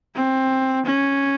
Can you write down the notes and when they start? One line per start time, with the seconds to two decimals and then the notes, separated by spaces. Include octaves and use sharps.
0.16 C4
0.86 C#4